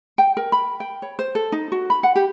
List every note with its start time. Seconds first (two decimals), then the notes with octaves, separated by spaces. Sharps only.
0.18 G5
0.37 A#4
0.52 B5
0.80 G5
1.02 C#5
1.19 C5
1.35 A4
1.52 D#4
1.72 F#4
1.90 B5
2.03 F#5
2.16 G4